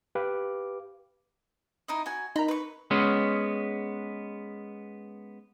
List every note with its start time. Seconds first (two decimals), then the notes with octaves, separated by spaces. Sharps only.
0.15 G4 B4 F5 D6
1.88 D#4 E4 D#5
2.06 F#4 G#5
2.36 D#4 A#4 B5
2.48 B4 C#6
2.91 G#3 B3 C#4